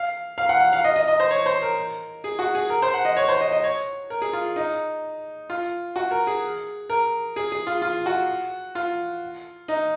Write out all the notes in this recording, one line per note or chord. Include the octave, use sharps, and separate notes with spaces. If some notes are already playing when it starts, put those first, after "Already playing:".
Already playing: F5
F5
F#5
F#5
F5
D#5
D#5
D#5
C5
C#5
C5
A#4
G#4
F#4
G#4
A#4
C5
F#5
D#5
C#5
C5
D#5
D#5
C#5
A#4
G#4
F4
D#4
F4
F#4
A#4
G#4
A#4
G#4
G#4
F4
F4
F#4
F4
D#4